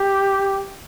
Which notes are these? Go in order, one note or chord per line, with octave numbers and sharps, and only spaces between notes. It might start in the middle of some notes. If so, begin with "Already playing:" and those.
Already playing: G4